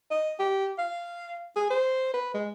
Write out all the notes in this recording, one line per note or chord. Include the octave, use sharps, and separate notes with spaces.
D#5
G4
F5
G#4
C5
B4
G#3